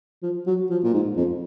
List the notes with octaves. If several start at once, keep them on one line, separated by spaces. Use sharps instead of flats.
F3
F#3
F3
A#2
G#2
F2